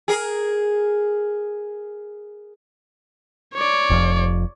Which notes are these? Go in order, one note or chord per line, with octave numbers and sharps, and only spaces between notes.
G#4 A#4
C#5 D5
F1 F2